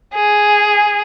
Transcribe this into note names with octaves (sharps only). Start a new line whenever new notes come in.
G#4